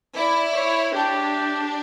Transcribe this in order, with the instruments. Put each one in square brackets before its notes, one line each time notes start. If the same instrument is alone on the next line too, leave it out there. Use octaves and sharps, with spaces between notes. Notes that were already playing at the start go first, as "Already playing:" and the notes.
[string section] E4 [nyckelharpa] D5
[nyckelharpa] C#5
[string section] D4 [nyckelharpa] G4